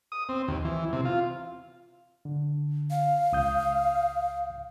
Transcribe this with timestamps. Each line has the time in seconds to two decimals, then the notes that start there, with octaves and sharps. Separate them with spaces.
0.12 D#6
0.29 C4
0.48 D#2
0.65 E3
0.93 C3
1.05 F4
2.25 D3
2.90 F5
3.32 C#2 D#6 G6